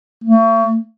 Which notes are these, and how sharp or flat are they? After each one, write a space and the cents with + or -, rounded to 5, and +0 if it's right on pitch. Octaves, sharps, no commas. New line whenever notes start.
A3 +40